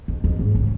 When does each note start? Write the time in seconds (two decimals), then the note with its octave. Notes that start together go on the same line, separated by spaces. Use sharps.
0.08 F2
0.24 F2
0.39 G#2
0.55 C#3